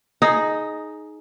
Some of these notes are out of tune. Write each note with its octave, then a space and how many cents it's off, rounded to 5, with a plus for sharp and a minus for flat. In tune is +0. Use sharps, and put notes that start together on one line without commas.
D#4 +0 G#4 +20